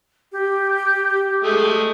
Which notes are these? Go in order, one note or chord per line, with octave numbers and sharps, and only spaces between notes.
G4
G#3 A3 D#6